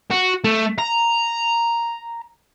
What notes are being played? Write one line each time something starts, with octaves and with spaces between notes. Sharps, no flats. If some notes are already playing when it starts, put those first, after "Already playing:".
F#4
A3
A#5